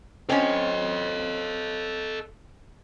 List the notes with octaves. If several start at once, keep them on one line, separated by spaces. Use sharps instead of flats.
C4 C#4 A4 D#5